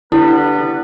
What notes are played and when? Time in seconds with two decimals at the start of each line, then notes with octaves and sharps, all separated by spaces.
0.12 D3 G3 B3 E4 B4